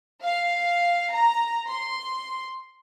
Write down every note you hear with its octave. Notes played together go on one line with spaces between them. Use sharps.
F5
A#5
C6